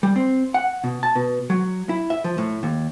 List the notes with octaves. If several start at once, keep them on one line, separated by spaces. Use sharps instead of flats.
G3
C4
F#5
B2
A5
B2
F#3
E4
E5
F3
A2
D#2